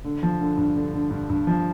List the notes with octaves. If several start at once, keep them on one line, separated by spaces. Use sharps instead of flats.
D3
F3
D3
G2
D3
D3
G2
G2
F3